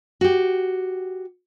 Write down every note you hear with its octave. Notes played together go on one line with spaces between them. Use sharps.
F#4 G4